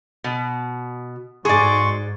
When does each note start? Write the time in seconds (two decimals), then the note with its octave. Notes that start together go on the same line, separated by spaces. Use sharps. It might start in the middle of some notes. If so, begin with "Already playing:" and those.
0.24 B2
1.45 G#2 F#4 G#4 D5 C6 C#6